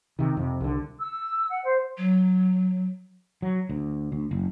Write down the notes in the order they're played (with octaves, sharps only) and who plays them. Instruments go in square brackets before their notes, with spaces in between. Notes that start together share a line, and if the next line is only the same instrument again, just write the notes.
[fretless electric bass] C3 D#3
F2 C3
C2 D3
[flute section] E6
F#5
C5
[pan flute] F#3
[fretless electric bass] F#3
D2
D2
F#1